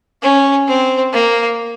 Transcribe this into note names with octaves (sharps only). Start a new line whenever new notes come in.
C#4
C4
A#3